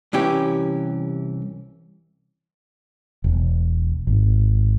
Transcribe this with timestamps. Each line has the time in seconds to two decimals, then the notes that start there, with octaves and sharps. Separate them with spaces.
0.13 C2 E3 C#4 G4
3.24 E1
4.07 G#1